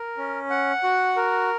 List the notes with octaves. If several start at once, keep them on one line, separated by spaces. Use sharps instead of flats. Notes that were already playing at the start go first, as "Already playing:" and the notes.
Already playing: A#4
C#4
F#5
F#4
A#4